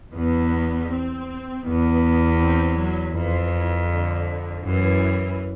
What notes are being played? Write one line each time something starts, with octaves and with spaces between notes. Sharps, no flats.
E2 B3
C4
E2 B3
C4
F#3
F2 E3
D3
F#2 E3